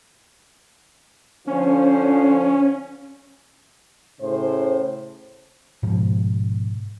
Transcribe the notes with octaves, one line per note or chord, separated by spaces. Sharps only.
D3 F3 C#4 C5
A2 C#3 C5
G#2 B2 F3